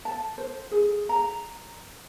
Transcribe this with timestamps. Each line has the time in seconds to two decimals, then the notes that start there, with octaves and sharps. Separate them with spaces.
0.05 A5
0.38 C5
0.71 G#4
1.09 A#5